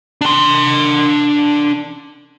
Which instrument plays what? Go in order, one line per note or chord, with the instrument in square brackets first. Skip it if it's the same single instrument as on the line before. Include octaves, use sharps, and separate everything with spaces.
[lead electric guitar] D4 C6